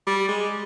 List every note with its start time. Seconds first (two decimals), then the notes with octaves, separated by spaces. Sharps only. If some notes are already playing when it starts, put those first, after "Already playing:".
0.07 G3
0.28 G#3